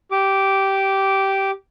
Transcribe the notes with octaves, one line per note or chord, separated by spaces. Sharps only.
G4 D6